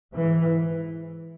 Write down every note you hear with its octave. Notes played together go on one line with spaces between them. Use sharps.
G#2 E3